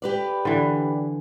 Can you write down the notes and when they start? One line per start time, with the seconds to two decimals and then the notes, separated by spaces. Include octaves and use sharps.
0.02 G4 B4 D5
0.45 D3 E3